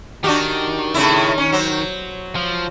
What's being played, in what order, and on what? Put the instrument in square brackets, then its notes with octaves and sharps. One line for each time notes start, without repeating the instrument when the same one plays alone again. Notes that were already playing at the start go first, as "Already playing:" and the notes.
[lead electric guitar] D#3 [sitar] D4 F#4 G4
[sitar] A2 C#3 E4
C#4
F#3 C5
[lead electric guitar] F3